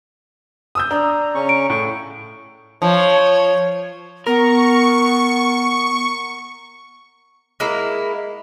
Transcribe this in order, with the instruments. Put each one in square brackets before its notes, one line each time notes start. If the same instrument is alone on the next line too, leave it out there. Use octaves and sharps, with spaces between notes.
[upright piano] D#6 E6 G6
[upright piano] D4 [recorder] A#5
[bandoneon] C#3 C#4 C#6
[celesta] D7
[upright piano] A2 [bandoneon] C#6
[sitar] F3 [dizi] C#5
[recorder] B3 [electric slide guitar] A#4 [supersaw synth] C#6
[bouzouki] G#3 A#3 E4